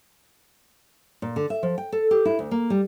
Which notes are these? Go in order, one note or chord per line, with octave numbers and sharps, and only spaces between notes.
A#2
D3
E5
F3
G5
A4
G4
E4
D2
A#3
G3